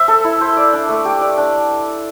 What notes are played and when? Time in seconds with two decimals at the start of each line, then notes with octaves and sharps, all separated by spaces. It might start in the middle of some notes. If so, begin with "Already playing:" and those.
Already playing: C5 E5
0.08 A4
0.24 E4
0.41 C5
0.57 D5
0.73 D4
0.89 A3
1.05 G4
1.21 D5
1.38 D4